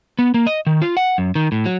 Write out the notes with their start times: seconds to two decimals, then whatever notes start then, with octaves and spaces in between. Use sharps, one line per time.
0.19 B3
0.34 A#3
0.47 D#5
0.67 D#3
0.82 F4
0.97 F#5
1.18 F#2
1.35 D#3
1.52 A2
1.66 F#3